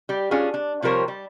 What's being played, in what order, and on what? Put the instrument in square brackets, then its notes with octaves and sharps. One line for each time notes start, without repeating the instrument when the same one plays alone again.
[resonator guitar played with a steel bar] G3 G4
C#4 D4 F4 G#4 C#5
D4
C3 F3 G3 A#4 C5 C#5
G3